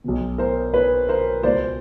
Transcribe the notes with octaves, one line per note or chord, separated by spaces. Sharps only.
B1 B2
A#4 C5
B4 C#5
A#4 C5
C#2 B2 C5 D5